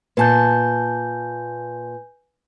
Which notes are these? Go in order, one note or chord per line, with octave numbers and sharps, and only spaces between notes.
A#2 B4 G#5 A5 G6